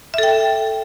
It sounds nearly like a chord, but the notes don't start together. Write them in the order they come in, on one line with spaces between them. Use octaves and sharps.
E5 A4 G5